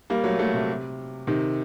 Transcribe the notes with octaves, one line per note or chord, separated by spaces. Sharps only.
G3 A#3
F#3 A3
F#3 A3
C3
C3 D#3